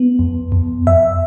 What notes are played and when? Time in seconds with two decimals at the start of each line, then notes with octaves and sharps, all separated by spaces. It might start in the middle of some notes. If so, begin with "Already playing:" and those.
Already playing: B3
0.19 F2
0.52 F2
0.87 F2 E5